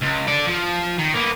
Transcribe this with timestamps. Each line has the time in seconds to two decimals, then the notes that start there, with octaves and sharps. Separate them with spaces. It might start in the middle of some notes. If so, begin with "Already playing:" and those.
0.02 C#2
0.27 A4 D5
0.47 F3
0.99 D#3
1.14 A#3 B3